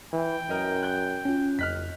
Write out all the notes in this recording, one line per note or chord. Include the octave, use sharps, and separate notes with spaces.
E3 G5
F#2 A#4 D#5
F#6 G6
C#4 F4
F#1 F2 D#5 F6 F#6 B6